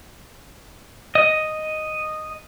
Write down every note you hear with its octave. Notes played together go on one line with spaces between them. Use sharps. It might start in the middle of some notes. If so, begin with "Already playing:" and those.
D#5